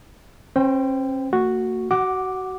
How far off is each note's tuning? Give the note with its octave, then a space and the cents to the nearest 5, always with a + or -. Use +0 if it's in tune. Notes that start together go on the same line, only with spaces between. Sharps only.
C#4 -45 C5 -25 G5 +0
A#3 -45 F#4 +0
F#4 +25 F#5 +0 D6 +0